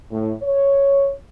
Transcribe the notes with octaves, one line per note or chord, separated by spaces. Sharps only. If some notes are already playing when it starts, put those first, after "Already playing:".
A2
C#5